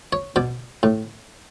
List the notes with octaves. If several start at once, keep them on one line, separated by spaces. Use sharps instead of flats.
C#5
B2 D5
A2